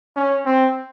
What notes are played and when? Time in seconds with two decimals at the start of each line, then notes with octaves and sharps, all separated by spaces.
0.16 C#4
0.46 C4